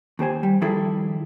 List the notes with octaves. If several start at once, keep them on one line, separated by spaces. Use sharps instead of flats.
D#2 G4 C5 G#5
G3
D#3 F3 G3 E4 G#4 A4